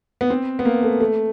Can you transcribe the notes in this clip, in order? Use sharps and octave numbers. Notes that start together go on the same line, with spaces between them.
B3
C4
B3
A#3
A3
A3